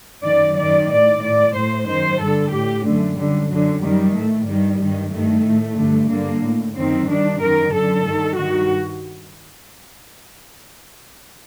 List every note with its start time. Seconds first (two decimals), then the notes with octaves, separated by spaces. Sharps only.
0.24 F#2 D#3 D5
0.56 F#2 D#3 D5
0.89 A2 D5
1.22 A2 D5
1.55 A2 C5
1.87 F#2 D#3 C5
2.20 G2 D3 A4
2.52 A2 G4
2.85 F#2 D3 A3
3.17 F#2 D3 G3
3.50 F#2 D3 F#3
3.82 F#2 D#3 G3
4.14 A2 A3
4.47 G2 D#3 G3
4.80 G2 D#3
5.12 G2 D#3 A3
5.45 A2
5.78 G2 D3
6.10 G2 D3 A#3
6.43 A2
6.75 F#2 D#3 C4
7.08 G2 D#3 D4
7.40 F#2 D#3 A#4
7.73 F#2 D3 A4
8.06 G2 D#3
8.38 G2 D#3 F#4